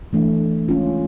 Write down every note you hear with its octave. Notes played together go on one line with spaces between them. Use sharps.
E3 A3 D4
G#3 C#4 F4